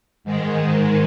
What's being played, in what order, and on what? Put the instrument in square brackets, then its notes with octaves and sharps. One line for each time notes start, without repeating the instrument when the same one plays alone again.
[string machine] G#2 D#3 G#3